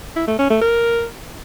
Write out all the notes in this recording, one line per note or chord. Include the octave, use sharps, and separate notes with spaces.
E4
A3
C#4
A3
A#4